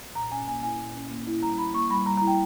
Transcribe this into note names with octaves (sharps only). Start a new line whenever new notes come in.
A#2 A#5
C#4 G#5
A#3 G#5
E4 G#5
A#2
C#4
A#3
E4
G3 A#5
E4 B5
A#3 C#6
G3 B5
G3 A#5
A#5
E4
G5